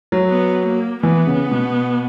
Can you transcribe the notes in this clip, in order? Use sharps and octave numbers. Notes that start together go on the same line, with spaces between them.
F#3
B3
A#3
E3 B3
C#3
B2